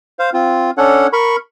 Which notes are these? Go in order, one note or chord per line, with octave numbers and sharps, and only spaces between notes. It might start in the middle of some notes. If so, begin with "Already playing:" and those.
C5 F5
C4 F4
C#4 D4 A4 C#5 F#5
A#4 B5 C#6